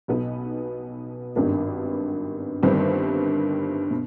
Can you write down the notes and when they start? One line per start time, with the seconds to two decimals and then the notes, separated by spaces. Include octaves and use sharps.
0.08 B1 B2 B3 D#4
1.35 G#1 G2 D#3 B3 D4
2.63 G1 G2 D#3 G3 C4
3.91 B2